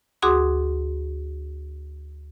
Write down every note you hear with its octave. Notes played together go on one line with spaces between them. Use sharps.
D2 F#4 G#4 C6 D6 D#6